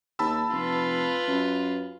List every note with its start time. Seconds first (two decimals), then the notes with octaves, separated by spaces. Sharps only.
0.19 D#2 A5 B5 E6
0.52 F1 F4 B4
1.28 F#2